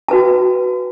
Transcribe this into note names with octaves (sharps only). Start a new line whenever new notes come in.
F#4 B4 A5